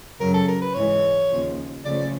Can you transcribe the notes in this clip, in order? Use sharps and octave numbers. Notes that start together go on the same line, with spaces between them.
F#2 C#3 F#3 A#4
A4
A#4
B4
G#2 E3 G#3 C#5
D#2 C#3 F3
C#3 F3 A3 D5